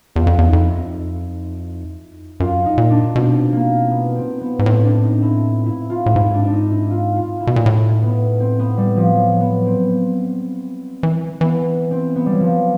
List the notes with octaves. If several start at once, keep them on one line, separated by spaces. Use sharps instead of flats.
E2 F4
F2
E2
D#4
F2 E4
F#2 F4
D#4
A#2
D4
B2 C4
A#3
B3
C4
B3
G#2
A2 C4
D4
D#4
E4
E4
F4
A2
G#2 E4
D4
D4
D#4
E4
F4
F4
E4
B2
A#2
A2 E4
B3
C4
B3
G3
F3
F#3
B3
C4
E3
E3 B3
C4
B3
G3
F#3
F3